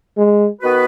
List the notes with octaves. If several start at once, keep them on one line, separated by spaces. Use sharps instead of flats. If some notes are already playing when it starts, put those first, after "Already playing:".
G#3
D#3 B3 F#4 B4